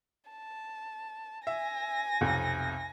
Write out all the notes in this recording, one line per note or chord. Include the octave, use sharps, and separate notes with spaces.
A5
E5 G#5 A#6
B1 F2 C3